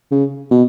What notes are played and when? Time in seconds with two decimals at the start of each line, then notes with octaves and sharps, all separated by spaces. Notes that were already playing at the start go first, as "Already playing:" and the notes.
0.12 C#3
0.51 B2